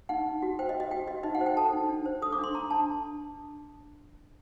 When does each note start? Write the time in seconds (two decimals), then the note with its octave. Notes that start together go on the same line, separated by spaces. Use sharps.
0.09 D#4 F#5
0.26 D#4
0.42 F#4
0.59 C5 G5
0.69 D#5
0.74 F#4
0.80 D#5
0.91 F#4 G5
1.08 F#4 D#5
1.23 D#4 D#5
1.35 F#5
1.41 C5
1.46 G5
1.57 A4 A5
1.73 D#4
1.89 D4
2.06 C5
2.22 A4 D#6
2.32 D6
2.38 D4
2.44 C6
2.54 D4 A#5
2.70 D4 A5